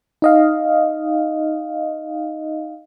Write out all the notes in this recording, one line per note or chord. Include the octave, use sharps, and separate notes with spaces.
D#4 D#5 F5